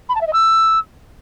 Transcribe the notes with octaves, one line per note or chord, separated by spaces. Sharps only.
B5
A5
E5
D#5
E6